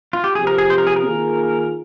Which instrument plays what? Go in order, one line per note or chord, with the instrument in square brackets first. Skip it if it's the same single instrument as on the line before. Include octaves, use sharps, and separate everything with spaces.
[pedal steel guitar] F4
G4
[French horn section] C3 F3 C4 G4 [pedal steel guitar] G#4
[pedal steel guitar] A#4
G#4
C5
A#4
G#4
A#4
[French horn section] D#3 A#3 F4 G#4